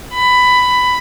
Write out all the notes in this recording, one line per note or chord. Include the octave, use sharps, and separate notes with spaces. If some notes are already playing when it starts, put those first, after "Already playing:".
B5